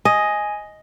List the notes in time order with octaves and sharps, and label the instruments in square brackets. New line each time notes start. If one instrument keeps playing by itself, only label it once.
[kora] D#5 [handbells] G#5